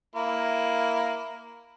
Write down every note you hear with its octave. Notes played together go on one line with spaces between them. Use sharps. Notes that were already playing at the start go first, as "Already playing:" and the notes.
A#3 E4